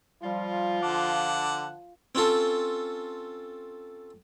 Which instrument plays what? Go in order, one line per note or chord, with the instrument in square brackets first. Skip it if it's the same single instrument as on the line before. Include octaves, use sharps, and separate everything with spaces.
[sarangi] F3 [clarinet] G3 [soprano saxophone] F4
[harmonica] D3 F#5 A5 [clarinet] D6
[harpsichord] C4 C#4 F4 A4